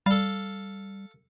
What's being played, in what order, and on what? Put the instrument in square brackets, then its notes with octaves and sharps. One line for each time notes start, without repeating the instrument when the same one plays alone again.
[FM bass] G3 [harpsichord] A4 F5